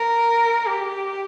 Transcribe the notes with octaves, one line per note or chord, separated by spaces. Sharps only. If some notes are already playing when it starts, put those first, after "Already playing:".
Already playing: A#4
G4